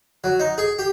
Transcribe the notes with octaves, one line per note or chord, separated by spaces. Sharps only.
F#3
D#4
G#4
G4